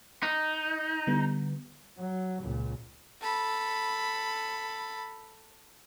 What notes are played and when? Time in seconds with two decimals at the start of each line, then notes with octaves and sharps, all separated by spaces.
0.23 D#4
1.07 D3 G3 B3
1.98 F#3
2.42 C#2 A#2
3.22 A4 B5